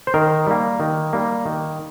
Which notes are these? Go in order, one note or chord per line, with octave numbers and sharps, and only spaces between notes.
C5
D#3 A#4
G3 A#3
D#3
G3 A#3
D#3